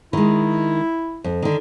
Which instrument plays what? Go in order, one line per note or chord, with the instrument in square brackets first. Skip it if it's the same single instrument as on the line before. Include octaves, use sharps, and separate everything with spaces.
[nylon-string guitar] D#3 G#3 [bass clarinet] E4
[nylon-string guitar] F2
D3 D#3